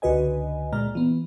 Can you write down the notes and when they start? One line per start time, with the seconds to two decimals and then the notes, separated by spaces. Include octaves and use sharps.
0.02 C#2 D3 F#4 B4 D#5 G#5
0.72 A#2 G#3 D5 A#5 F6
0.95 E3 B3